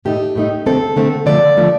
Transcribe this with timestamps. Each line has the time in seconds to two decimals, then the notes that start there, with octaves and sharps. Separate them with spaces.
0.05 A2 A3 D#4 G4
0.35 A2 A3 D#4
0.66 D3 A3 C4 A4
0.96 D3 A3 C4
1.26 D3 F3 A3 D5
1.57 D3 F3 A3